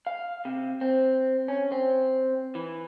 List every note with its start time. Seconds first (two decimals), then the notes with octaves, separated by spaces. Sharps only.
0.07 F5
0.45 C3
0.81 C4
1.48 C#4
1.72 C4
2.55 E3